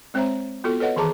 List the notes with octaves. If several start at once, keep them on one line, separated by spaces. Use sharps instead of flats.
G#3 C4 C5 C#5 E5 A#5
B3 F4 F#4 A4
A4 B4 C#5 D#5 F#5
D#3 E3 G#4 A5 A#5 D6